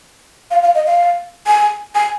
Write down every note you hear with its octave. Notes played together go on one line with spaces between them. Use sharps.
F5
F5
D#5
F5
G#5
G#5